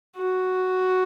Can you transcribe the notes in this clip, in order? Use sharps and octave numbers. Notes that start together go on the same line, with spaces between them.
F#4